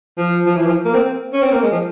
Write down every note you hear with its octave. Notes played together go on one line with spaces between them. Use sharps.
F3
F3
E3
F3
A#3
C4
C#4
C4
A#3
G#3
F3